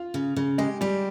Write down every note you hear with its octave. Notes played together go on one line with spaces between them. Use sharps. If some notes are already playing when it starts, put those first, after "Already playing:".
Already playing: F4
C#3
C#3
G#3 G4
G3 G4